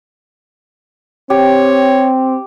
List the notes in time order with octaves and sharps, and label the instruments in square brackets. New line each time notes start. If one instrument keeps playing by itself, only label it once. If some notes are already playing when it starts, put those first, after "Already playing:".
[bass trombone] C4 [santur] G4 [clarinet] C#5